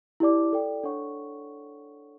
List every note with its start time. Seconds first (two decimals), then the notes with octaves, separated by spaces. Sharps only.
0.20 E4 G4 D5 A5 D6
0.52 A4 D5 G5
0.83 D4 A4 C#5 F#5 C#6